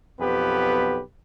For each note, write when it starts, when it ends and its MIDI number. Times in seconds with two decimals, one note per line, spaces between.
0.20 1.00 35
0.20 1.00 41
0.20 1.00 59
0.20 1.00 67
0.20 1.00 71